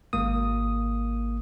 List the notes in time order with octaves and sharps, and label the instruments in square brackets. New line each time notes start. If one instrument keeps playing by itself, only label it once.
[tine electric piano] G#1 G#3 A#3 D#6